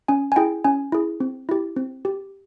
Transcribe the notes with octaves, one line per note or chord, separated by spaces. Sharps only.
C#4 G#5
G#5
E4 G#4 G5
C#4 G#5
E4 G#4
C4
E4 G4
C4
G4